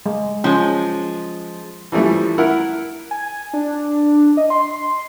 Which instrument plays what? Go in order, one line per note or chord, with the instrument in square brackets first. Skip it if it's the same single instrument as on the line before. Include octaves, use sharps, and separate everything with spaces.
[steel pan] G#3
[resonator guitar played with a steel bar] F3 G#3 [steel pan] C#4
[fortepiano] E3 F3 G3 A3
E4 A#4 F#5
[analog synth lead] G#5
D4
D#5
C6
C6